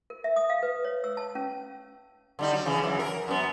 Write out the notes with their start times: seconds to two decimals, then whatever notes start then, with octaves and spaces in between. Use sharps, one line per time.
0.10 A#4
0.24 E5
0.36 D#6
0.50 F5
0.63 B4
0.84 C#5
1.04 E6
1.17 A5
1.35 C#4
2.39 D3 G3 D#4
2.53 F#3
2.66 C#3 E3
2.83 F#2 C#3 E3
2.99 A#4
3.28 F#2 B3